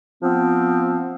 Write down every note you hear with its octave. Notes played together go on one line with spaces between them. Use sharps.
F3 B3 C4